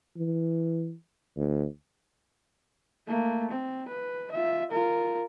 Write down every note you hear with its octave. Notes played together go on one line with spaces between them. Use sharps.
E3
D2
A3 A#3
C4
B4
F4 E5
F4 A#4